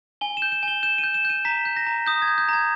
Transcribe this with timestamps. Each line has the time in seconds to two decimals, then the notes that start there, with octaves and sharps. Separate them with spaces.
0.21 G#5 G7
0.37 E7
0.42 G6
0.52 E7
0.63 G#5
0.68 G7
0.83 G6 E7
0.98 D#7
1.04 G6
1.14 E7
1.25 G6 D#7
1.45 A#5 B6
1.65 G6
1.77 A#6
1.86 A#5
2.06 D#6 G6
2.22 G#6
2.28 G6
2.38 G6
2.49 A#5 G#6